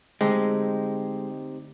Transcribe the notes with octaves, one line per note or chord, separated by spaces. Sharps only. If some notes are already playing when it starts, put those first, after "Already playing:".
D3 G#3 A3 C4 D#4 G4